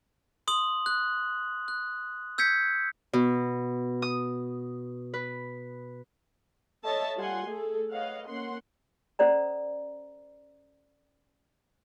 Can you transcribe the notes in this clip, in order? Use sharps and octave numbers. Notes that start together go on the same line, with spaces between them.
C6 D#6 F#7
F#6
F#6
E6 G6 G#6 B6 C#7
B2
D#6
B4
A4 C#5 D#5 E5 A5
G3 F4 F#5 G#5 C6
A3 G#4 A4
B4 C#5 D#5 F5 F#5
A#3 C#4 F#5 C6
C#4 A4 C5 D5 A#5